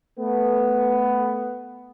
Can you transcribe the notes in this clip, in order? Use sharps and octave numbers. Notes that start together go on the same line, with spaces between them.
A3 B3